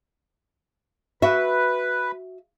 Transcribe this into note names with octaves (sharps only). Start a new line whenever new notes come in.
F#4 B4 E5